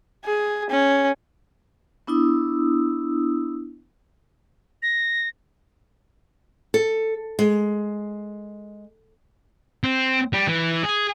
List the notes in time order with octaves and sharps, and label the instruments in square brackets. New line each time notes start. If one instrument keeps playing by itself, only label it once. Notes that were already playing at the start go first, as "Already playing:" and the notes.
[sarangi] G#4
C#4
[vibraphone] B3 D4 E4 D#6 E6
[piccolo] A#6
[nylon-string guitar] A4
G#3
[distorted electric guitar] C4
G3
E3
G#4